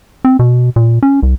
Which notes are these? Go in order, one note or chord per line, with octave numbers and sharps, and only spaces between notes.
C4
B2
A#2
C#4
C2